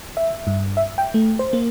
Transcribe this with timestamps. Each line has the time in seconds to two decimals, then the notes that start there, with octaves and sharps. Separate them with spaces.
0.17 E5
0.47 G2
0.77 E5
0.98 G5
1.14 A3
1.39 C5
1.53 A#3